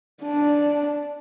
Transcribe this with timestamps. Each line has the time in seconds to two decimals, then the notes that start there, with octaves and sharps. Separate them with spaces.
0.23 D4